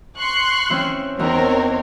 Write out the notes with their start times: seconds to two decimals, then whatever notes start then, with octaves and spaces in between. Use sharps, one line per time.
0.18 C6 C#6 F#6
0.70 E3 C4 C#4
1.19 E2 E3 C4 D#4 A#4 C#5